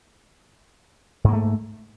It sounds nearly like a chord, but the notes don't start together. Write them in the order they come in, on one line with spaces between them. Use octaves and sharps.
G#2 A#3 A3